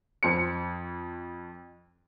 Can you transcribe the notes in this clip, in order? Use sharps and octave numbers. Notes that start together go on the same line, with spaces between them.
F2 C5 C#7